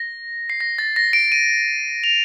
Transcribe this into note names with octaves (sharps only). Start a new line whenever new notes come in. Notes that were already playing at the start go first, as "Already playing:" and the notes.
Already playing: A#6
C7
A#6
A6
A#6
D7
D#7
F7